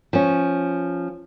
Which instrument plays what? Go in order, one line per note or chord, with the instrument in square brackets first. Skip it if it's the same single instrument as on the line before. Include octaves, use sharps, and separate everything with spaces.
[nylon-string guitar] F3 C#4